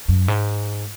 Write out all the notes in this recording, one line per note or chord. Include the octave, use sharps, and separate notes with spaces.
F#2
G#2